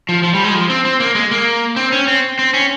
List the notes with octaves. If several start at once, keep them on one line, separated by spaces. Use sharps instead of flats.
F3
F3
G3
G#3
F3
C4
C4
A#3
G#3
A#3
C4
C#4
C4
C4
C#4